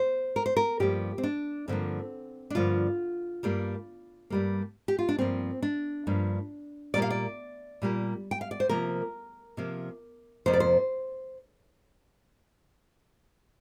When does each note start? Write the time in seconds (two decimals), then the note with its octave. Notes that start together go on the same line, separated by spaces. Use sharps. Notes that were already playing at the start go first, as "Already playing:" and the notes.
Already playing: C5
0.36 A#4
0.46 C5
0.57 A#4
0.80 G2 F3 A#3 G4
1.18 C4
1.23 D4
1.68 G2 D3 F3 A#3 C4
2.50 D4
2.55 G2 D3 F3 A#3 F4
3.43 G2 G3 A#3
4.30 G2 G3 A#3
4.88 G4
4.99 F4
5.09 D4
5.19 G2 F3 A#3 C4
5.62 D4
6.07 G2 F3 A#3
6.94 A#2 G3 A#3 D5
7.02 F5
7.10 D5
7.82 A#2 G3 A#3
8.31 G5
8.41 F5
8.51 D5
8.60 C5
8.69 C3 F3 A#3 A#4
9.57 C3 F3 A#3
10.46 F2 C3 F3 A#3 C5
10.53 D5
10.60 C5